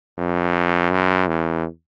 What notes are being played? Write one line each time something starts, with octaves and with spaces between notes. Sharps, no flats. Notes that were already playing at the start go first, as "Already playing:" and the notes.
F2
F#2
E2